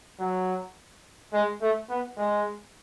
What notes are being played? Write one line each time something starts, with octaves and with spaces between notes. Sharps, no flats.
F#3
G#3
A3
B3
G#3